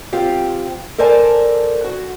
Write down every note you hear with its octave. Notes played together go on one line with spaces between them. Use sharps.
C4 F4 G4
A4 A#4 C5 D5 G#5 A5
F#4